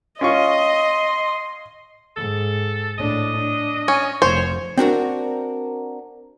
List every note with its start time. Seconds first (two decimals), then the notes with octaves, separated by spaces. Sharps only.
0.21 C#4 F4 D#5 C6 C#6
2.17 G#2 A4
2.99 A2 D4 D#5
3.36 D4
3.88 C#4
4.22 F1 C5 C#5
4.78 C4 D4 F#4 A#4